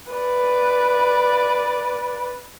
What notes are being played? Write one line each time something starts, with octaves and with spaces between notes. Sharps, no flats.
B4 D5